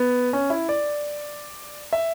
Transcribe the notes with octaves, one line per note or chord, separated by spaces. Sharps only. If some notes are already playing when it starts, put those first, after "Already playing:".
Already playing: B3
C#4
E4
D5
E5